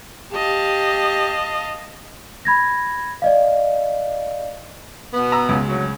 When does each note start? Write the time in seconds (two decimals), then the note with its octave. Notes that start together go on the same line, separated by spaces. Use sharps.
0.32 G4 D#5 F5 A5
2.45 B5 G#6 A#6
3.22 D5 D#5 F5
5.14 B2 B3
5.32 A#5 E6
5.49 C#2 C#3
5.66 D2 F#3